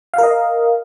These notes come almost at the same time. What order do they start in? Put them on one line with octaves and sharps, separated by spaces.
F5 A#4 D#5